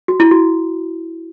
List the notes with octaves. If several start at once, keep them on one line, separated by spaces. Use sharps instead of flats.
F#4
E4
F#4